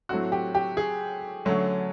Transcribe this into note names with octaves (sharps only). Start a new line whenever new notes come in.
A2 F#3 A3 C4 F#4
G4
G4
G#4
D3 F#3 A3 C#4